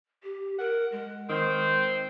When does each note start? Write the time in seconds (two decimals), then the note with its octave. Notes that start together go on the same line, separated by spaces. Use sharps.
0.23 G4
0.59 A#4 F#5
0.92 G#3
1.30 D#3 C4 C5